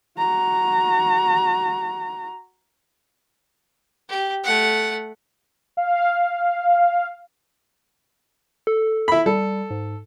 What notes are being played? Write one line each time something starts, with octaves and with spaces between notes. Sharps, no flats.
F#4 A#5
G4
A3 F#5
F5
A4
E4 B5
G3 A4
G#2